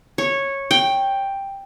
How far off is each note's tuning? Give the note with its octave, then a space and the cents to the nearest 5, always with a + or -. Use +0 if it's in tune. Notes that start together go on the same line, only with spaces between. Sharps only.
C#5 -10
G5 +5